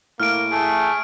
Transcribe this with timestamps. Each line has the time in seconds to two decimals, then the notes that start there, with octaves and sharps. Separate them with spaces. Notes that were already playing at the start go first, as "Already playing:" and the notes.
0.20 A2 A#3 F6 D7
0.51 A3 G#4